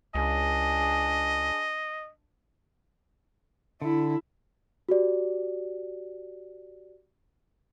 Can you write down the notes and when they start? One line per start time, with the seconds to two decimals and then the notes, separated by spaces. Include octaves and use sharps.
0.15 C#2 D4 G#4 D#5
3.82 D3 E4
4.89 F#4 G4 D5